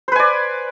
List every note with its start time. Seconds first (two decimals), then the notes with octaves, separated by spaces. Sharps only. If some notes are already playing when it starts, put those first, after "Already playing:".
0.08 C5
0.12 B4
0.16 G#5
0.19 D5